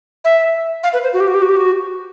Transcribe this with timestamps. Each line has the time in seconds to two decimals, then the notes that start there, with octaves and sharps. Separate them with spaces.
0.25 E5
0.83 F5
0.93 B4
1.03 C5
1.13 F#4
1.20 G4
1.28 F#4
1.34 G4
1.42 F#4
1.49 G4
1.57 F#4